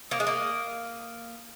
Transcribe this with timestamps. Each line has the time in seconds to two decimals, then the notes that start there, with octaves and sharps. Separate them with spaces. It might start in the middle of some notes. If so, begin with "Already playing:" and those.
0.11 A#3 D#6
0.20 G#3
0.27 A#3